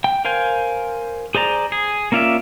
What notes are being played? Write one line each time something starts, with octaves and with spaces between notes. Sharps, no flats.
G5
A#4 C5 F5 G#5 G6
G#4 C5 D5 A#5
G#4
A#3 C#4 F4 D5 E5